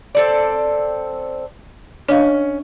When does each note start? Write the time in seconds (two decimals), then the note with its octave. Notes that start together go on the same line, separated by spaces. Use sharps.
0.15 C4 A4 D5
2.09 C#4 D4 D#5 F5